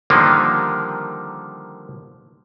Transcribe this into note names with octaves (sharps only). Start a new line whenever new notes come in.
D3 D#3 F3 G3 A#3